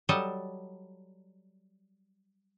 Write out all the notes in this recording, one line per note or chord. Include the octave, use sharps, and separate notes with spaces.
F#3 G3 A4 D#5